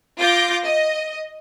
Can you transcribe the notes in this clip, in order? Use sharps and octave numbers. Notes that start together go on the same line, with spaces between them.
F4 D6 G6 A#6
D#5